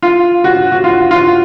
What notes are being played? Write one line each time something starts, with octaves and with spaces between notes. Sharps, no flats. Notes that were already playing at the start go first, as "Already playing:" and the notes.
F4
F#4
F#4
F4
F4